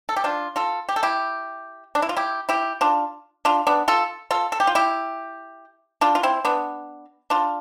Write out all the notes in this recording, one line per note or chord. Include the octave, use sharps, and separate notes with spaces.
A4
G4
D4 F4
F4 A4
G4
A4
E4 G4
D4
E4
F4
E4 G4
E4 G4
D4 F4
D4 F4
B3 D4
F4 A4
F4 A4
A4
G4
F4
E4 G4
D4 F4
F4
C4 E4
B3 D4
D4 F4